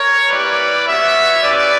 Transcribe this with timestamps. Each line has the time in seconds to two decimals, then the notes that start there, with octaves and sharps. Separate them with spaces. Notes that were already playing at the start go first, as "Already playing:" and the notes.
Already playing: A#4 C#5
0.30 G3 A#3 E4 G4 B4 D5
0.86 G3 B3 F#4 C#5 E5
1.42 G3 C#4 E4 B4 D5